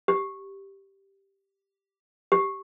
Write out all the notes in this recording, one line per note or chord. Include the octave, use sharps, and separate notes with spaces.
G4
G4